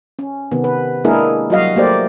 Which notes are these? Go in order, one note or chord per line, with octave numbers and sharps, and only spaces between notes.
C#4
C3 D#3 B3
B4
G#3 A#3 D4 E4 G#4 A#4
F#3 G3 F#4 D#5 F5
A3 A#3 G4 C5 D5